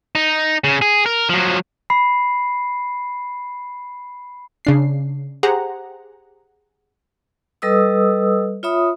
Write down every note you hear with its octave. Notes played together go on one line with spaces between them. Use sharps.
D#4
C#3
G#4
A#4
F3 F#3
B5 C7
C#3 D4 C7
G4 G#4 C5 F#5 A#5
G3 A4 B4 D#5 D#6 E6
F4 C#5 E5 B5 D#6